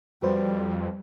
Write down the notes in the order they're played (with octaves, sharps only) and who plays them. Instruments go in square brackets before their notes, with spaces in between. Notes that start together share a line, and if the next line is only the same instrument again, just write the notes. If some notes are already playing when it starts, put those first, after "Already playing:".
[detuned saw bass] F2 [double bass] G3 [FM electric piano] F#4 B4 C5